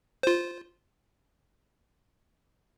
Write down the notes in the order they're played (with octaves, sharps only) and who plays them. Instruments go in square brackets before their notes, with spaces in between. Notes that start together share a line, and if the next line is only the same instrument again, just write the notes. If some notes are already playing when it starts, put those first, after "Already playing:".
[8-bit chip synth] F4 C5